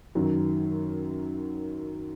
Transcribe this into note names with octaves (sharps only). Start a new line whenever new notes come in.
F#2 D#3 F#3